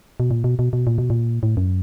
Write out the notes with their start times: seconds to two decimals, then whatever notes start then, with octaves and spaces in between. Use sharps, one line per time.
0.20 B2
0.31 A#2
0.44 B2
0.59 B2
0.73 B2
0.87 A#2
0.98 B2
1.10 A#2
1.43 A2
1.57 F#2